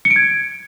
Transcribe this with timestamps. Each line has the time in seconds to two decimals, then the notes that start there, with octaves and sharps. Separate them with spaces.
0.05 C#7
0.11 D7
0.16 G#6